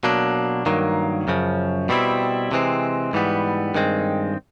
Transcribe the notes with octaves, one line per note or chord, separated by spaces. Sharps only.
B2 F#3 A#3 D4
G2 D#3 F#3 A#3
F#2 C#3 F3
B2 G3 C4 E4
C3 E3 G#3 C4
G#2 E3 G3 B3
G2 D#3 G#3 C4